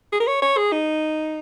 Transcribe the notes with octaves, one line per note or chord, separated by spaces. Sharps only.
G#4
A#4
C#5
C#5
G#4
D#4